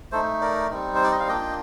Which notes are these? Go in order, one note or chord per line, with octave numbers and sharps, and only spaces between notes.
A3 D#4 A4 C5
A#4 D5
G3 C4 D#4
C5
D5
D#5
F5
A#3 D4 F4 D#5 G5